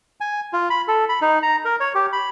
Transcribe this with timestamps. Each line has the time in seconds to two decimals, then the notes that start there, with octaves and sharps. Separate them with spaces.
0.21 G#5
0.53 F4
0.70 B5
0.88 A4
1.09 B5
1.21 D#4
1.43 A#5
1.65 A#4
1.80 C#5
1.95 G4
2.13 B5